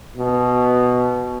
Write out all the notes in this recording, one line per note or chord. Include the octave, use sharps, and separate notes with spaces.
B2